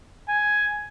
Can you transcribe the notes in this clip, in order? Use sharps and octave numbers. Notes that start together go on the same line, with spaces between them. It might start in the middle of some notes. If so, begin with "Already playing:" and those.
G#5